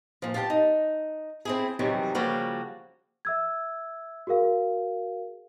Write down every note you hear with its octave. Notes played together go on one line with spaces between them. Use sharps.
A#2 F3
F4 G4 F#5 A5
D#4
C4 E4 G#4
F#2 C3 D#3 E3 F#3 G3
C#3 F3 G3 A#3 F#4
E5 E6 G#6
F#4 G#4 A#4 F5